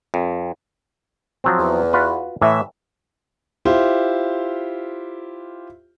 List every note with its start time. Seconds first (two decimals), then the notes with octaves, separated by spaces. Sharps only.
0.14 F2
1.44 F3 F#3 C4
1.58 E2
1.93 F4 F#4 B4
2.42 A2 E3 E5
3.65 E4 F4 G4 C5